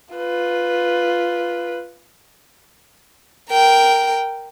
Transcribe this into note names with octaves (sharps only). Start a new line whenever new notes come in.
F4 B4
A#4 G5